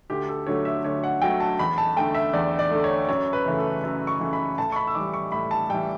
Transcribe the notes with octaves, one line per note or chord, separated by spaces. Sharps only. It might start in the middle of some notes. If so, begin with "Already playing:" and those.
D2 G4
A4
D3 F#3 A3 C#5
E5
D2 C#5
F#5
D3 F#3 A3 G5
A5
E2 B5
A5
D3 A3 G5
E5
E2 D5
D5
D3 A3
C#5
F#2 C#5
B4
C#3 E3 A3
A4
F#2
C#6
C#3 E3 A3
B5
A2 A5
C#6
B5
E6
E3 G3 D6
C#6
A2 B5
A5
E3 G3 G5